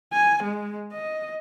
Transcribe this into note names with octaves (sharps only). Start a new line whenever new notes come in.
G#5
G#3
D#5